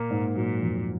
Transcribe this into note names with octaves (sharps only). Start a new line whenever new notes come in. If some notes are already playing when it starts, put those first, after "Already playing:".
Already playing: A#2 A#3
G#2
A#2 F#3
F2